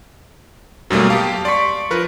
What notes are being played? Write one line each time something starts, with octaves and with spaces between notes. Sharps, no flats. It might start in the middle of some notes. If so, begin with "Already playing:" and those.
F#2 B2 F#3 G3 A3 A#3
G4 F5 A5 D6 D#6
D5 C6 C#6 B6
F3 A#4 B4